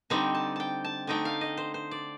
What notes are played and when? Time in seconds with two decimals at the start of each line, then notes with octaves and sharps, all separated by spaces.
0.10 D3 G3 C4 D#4 G5
0.35 A5
0.56 G5 A5
0.84 A5
1.07 D3 A3 D#4 G5
1.25 F5
1.41 D#5
1.57 C5
1.74 C5
1.91 D5